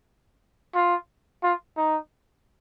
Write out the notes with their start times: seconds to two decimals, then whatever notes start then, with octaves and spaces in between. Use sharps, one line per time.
0.75 F4
1.43 F4
1.77 D#4